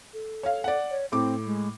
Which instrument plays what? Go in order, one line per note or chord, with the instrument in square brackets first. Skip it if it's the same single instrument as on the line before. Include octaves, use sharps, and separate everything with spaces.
[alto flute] A4
[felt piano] C#5 F5
D5 F#5
[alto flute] C#5
[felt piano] A2 D6 [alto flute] C4
[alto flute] G#3